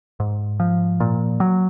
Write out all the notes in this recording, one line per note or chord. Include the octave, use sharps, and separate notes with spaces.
G#2
F3
A#2
F#3